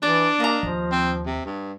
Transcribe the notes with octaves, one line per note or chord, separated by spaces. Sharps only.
E3 D4 D5
A#3 D#5 A#5
D#2 F3
C4
C3
G2